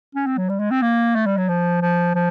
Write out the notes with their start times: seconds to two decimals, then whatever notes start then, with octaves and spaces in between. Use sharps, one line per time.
0.15 C#4
0.26 C4
0.38 F#3
0.49 G3
0.59 G#3
0.71 C4
0.82 A#3
1.15 A3
1.26 G3
1.37 F#3
1.49 F3
1.82 F3
2.15 F3